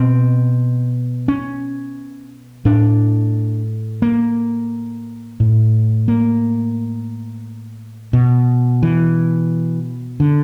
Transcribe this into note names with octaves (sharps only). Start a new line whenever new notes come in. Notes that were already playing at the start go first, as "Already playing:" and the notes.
Already playing: B2 C4
C#4
A2 D4
A#3
A2
A#3
B2
E3
D3